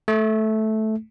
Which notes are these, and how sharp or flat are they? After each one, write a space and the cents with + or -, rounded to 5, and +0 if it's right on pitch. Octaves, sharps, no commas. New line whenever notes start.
A3 -10